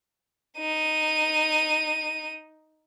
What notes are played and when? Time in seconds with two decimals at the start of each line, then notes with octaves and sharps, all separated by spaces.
0.59 D#4 D#7